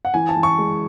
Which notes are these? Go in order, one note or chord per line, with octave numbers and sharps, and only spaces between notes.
F#5
E3 G#5
A5
E3
C#6
G#3